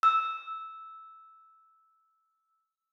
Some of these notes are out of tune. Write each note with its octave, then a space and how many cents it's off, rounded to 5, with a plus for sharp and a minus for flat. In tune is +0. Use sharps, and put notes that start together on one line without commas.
E6 -10